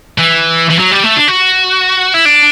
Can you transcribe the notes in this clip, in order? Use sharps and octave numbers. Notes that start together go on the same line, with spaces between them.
E3
E3
F#3
G3
A3
D4
F#4
E4
D4